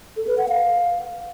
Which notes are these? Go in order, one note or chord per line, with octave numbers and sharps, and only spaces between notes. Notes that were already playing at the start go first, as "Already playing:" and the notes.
A4
B4
F#5
F5